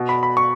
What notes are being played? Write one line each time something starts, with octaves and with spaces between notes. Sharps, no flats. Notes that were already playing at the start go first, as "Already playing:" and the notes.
Already playing: B2
B5
B5
C#6